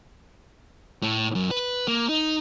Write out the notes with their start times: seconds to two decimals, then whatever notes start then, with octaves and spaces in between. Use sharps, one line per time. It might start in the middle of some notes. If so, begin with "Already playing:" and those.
1.02 A2
1.35 F#2
1.51 B4
1.88 A#3
2.09 D#4